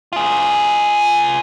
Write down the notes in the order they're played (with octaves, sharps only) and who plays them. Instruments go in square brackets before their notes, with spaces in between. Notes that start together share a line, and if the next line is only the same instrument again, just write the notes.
[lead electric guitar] F4 G#4